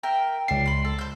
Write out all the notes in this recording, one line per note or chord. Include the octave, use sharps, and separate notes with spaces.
A#4 E5 G5
C#2 D4 C7
B5 C6
A4
C5 G6